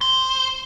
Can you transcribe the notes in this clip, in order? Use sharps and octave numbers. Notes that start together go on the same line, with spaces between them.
C5